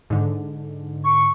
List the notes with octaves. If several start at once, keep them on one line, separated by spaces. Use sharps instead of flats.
G#2 D3
C#6